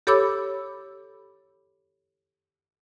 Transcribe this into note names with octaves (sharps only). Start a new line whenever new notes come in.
G4 A4 C#5 B5 D6 E6